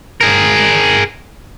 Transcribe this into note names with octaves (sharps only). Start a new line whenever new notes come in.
G#4 A#4